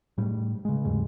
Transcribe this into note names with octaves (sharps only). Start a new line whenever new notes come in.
A2 G3
C#3 G#3
F1 D#2 G#2 G#3